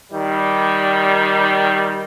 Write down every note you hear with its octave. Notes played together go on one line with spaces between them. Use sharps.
D#3 G3